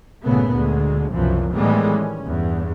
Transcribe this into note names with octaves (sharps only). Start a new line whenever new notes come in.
G1 A#2 C#3 A3 B3
D2 D3 G#3
C2 F#2 B2 E3 F3
A2 D#3 E3 G3 G#3 B3
C#4
E2 G2